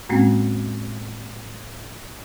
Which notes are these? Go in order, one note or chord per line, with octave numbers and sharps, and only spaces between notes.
A2 G#3 A#3 C4 C#4